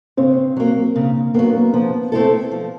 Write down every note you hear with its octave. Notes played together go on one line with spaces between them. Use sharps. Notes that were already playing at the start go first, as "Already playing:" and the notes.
C#3 C4
F#3 A#3
C#3 A#3
F#3 A#3 B3
A#3
F3 B3
A3 C4 E4 A4
F3